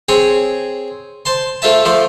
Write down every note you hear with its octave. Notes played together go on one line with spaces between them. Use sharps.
C4 G#4 C#5
C5 A5 C6
A3 F4 C5 E5 A5
F3 A3 C5